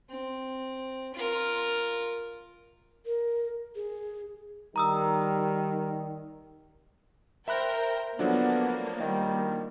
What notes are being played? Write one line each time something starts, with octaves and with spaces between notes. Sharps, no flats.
C4
F4 A#4
A#4
G#4
D#3 G3 A#5 D#6 E6
A#4 C5 E5 G5 B5 F#6
D3 F3 F#3 A#3 B3 D4
D#3 G3